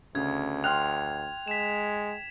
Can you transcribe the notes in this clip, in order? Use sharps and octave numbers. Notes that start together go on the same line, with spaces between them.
D2 C#3 G#6
G5 C6 F6 F#6 F7
G#3 B6 E7